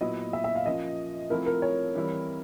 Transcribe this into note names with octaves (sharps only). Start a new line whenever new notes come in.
A#2 F#3 B3 E4 D#5
E5
E5
F5
F3 A#3 C#4 D#5
F3 A3 C4 E4 A#4
A#4
C#5
E3 G3 C4 E4